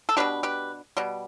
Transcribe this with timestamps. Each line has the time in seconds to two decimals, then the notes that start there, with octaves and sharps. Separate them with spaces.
0.09 A4
0.17 B2 G3 D4 G4 B4
0.43 G4 B4
0.97 B2 G3